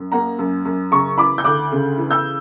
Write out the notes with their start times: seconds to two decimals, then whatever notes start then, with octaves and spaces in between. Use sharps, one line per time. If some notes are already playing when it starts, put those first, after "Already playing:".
Already playing: F#2
0.12 A#3 F#5 A#5
0.39 F#2
0.65 F#2
0.91 C#3 A#5 C#6
1.18 E3 B5 D6
1.38 G6
1.44 D2 D6 F#6
1.72 C#3
1.98 E3
2.11 E6 G6